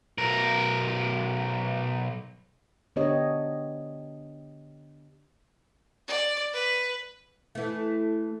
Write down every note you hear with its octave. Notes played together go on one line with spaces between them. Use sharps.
B1 A#4
D3 B3 D4 G4 C#5 D#5
D5
B4
E3 A3